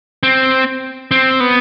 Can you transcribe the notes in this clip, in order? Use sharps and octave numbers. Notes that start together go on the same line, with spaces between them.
C4
C4
B3